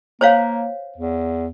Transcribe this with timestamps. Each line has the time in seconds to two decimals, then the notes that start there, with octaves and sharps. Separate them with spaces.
0.21 A#3 C5 C#5 F5
0.98 E2